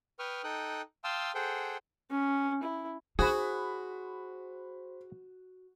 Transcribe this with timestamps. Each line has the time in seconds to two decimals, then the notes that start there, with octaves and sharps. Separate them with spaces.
0.19 B4 G5 C#6 D#6 F6
0.44 D#4 A4 G5 D#6 F#6
1.04 F5 G5 A5 C6 D#6 E6
1.35 G#4 A4 C5 F#5 G5
2.10 C#4
2.63 E4
3.19 D#4 F#4 G#4 C5 B5